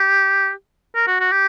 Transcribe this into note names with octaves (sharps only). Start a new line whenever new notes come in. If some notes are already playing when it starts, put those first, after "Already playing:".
Already playing: G4
A#4
F#4
F#4
G4